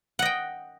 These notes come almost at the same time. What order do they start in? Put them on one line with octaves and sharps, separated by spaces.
F#5 D#5 G5